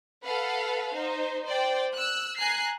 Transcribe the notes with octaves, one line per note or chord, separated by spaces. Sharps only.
A4 B4 F5 F#5
D#4 C5
C5 D5 G5
E6 F#6
G#5 A#5 F#6 C7